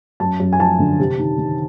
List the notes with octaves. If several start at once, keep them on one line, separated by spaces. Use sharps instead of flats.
F#2 A5
F#2
G#5
F3 A5
D3
C3
D#3
D#3